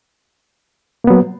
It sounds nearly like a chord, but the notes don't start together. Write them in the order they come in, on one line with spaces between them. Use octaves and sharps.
A#3 B3 F#3